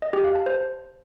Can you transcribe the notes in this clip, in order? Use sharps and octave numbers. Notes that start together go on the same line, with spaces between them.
D#5
G4
F5
A5
C5